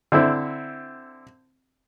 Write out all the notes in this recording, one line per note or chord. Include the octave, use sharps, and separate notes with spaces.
D3 C4 E4